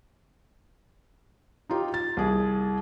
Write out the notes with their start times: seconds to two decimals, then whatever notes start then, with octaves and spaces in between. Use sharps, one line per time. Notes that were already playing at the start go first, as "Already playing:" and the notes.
1.70 D#4 F4 G4
1.94 A6
2.17 C2 G#4